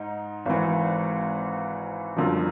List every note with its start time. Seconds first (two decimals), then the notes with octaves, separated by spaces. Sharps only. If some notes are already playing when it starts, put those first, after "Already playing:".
Already playing: G#2 D#4
0.46 G#1 G#2 E3
2.16 G1 F#2 D3 F3